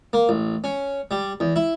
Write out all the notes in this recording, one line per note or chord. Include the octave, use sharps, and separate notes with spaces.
A#3
A1
C#4
G3
E2
E4